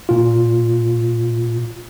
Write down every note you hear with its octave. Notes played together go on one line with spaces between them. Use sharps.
A#2 F4